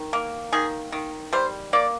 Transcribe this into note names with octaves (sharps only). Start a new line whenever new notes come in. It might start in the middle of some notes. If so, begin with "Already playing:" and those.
Already playing: D#3
A#3
D#3 G#4
D#3
G3 C5
A#3 D5